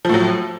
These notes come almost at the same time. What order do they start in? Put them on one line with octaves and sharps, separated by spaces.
F3 A2 F#3